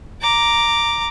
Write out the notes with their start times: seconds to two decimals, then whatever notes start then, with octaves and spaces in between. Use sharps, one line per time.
0.22 A#5 D6